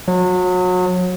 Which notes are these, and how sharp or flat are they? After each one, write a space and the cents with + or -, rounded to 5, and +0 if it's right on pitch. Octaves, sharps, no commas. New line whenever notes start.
F#3 -30